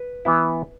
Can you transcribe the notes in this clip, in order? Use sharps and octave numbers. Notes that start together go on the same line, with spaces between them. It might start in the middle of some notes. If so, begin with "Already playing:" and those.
Already playing: B4
E3 B3 E4